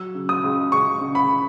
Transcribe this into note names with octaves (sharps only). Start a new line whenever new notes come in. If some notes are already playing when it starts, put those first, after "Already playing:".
Already playing: F#3 E6
C#3
D#6
C#2
C#2 C#6
C#3
B5